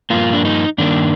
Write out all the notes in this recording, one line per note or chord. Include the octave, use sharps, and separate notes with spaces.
G2 F3 A#3 F4
D4
D#4
G2 D#3 A#3 D4